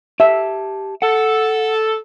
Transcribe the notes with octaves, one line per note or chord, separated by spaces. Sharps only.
G4 E5 A5
A4 F#5